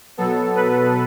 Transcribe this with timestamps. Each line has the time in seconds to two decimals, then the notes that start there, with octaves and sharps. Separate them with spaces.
0.17 B2 F#3 B3 A4
0.55 B4